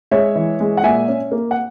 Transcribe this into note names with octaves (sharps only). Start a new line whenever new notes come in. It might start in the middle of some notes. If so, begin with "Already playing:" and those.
G#3 C#5 E5
E3
G#3
F#5
A#2 E5 G#5
C#4
A#3
F#5